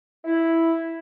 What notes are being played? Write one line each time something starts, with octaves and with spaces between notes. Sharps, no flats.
E4